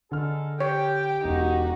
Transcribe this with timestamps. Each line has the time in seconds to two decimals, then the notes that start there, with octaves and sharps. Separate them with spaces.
0.11 D3 D#4 G#4 A4 F6
0.60 G4 C#5 G5
1.24 E1 D#4 F#4